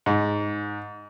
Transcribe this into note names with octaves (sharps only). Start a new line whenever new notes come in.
G#2